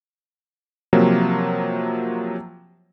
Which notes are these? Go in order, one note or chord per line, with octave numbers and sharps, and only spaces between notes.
C3 F3 F#3 A#3